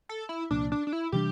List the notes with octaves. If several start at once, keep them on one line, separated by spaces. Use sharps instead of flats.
A4
E4
C2 A#2 F3 D4
D4
D4
E4
C3 E3 G3 D4 G4